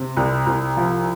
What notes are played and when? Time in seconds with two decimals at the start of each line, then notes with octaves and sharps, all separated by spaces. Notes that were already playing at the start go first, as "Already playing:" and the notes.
Already playing: C3
0.17 C2
0.46 C2
0.77 F3